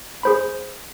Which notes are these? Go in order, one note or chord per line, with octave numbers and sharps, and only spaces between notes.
G#4 C5 B5